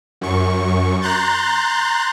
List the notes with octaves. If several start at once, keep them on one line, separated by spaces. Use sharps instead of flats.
F#2 C#6
A#5 C6 F#6 G6 A6